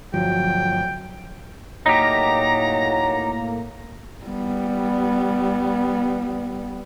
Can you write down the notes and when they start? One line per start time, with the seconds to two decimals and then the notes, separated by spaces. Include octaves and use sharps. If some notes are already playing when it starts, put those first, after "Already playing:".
0.14 G1 F3 F#3 G5
1.86 A2 F#3 A#3 D#4 G4 A#5
4.26 G3 B3